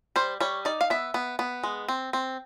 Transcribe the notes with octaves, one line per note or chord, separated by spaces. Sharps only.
G3 C5
G3 C#5
D#4 D5
F5
B3 E5
B3
B3
G#3
C4
C4